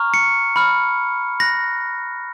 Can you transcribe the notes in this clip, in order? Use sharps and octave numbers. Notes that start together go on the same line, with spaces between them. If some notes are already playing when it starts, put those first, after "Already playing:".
Already playing: A#5 C#6 F6
C#7
B5 F6
B5 F#6 A#6